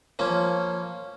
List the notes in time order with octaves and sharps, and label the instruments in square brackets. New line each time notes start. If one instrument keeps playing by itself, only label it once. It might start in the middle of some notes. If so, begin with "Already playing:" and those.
[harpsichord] F3 A#3 C#4